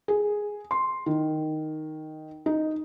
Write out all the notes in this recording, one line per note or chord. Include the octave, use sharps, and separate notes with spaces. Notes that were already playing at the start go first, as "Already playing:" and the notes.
G#4
C6
D#3
D#4